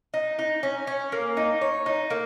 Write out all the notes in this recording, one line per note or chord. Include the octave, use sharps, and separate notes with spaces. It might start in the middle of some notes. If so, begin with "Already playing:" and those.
D#4
D#4
C#4
C#4
A#3
D#4
C#5
D#4
A#3